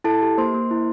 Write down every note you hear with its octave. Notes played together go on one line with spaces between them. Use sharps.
E4 A4 A5
G4
A#3 C5 C6
A#3
E4